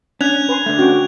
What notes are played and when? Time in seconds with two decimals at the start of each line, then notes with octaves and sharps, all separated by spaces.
0.21 C#4 D4 F#6 G#6 F7
0.49 B4 G#5 C6
0.66 D3 A3
0.79 C#4 F#4 G5